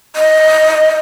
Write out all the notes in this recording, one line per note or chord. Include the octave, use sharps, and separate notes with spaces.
D#5